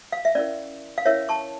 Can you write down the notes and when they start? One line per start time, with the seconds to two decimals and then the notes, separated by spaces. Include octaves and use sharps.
0.12 F5
0.25 E5
0.35 C#4 E4 A#4 D5
0.98 F5
1.06 C#4 E4 A#4 C#5 E5
1.29 A5 C#6